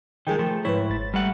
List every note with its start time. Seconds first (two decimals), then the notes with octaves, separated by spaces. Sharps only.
0.27 D#3 F3 G#3 G#4 A#4 G5
0.39 F3 A3
0.65 G#2 C#3 E4 B4 C#5
0.89 G1 A6
1.14 G3 A3 F#5